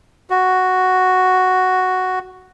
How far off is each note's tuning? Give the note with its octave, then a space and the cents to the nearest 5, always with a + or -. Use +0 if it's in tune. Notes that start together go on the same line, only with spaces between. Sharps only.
F#4 +0